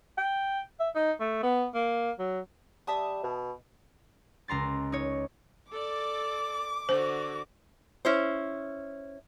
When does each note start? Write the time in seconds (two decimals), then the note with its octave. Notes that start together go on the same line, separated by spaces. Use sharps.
0.18 G5
0.80 E5
0.95 D#4
1.20 A3
1.43 B3
1.75 A#3
2.19 F#3
2.87 G3 E5 A5 D#6
3.24 B2
4.48 C#2 A#5 C6 A6
4.92 D#4 C#5
5.72 A4 D5 D6
6.89 D3 F#4 C5
8.05 C#4 E4 C5